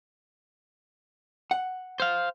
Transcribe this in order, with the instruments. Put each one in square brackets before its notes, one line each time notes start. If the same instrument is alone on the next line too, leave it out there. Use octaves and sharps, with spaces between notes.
[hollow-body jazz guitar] F#5
[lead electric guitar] C5 F5